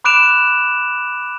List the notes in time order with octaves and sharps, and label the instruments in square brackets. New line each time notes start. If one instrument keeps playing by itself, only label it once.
[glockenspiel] B5 D6 F#6 D7 E7 F7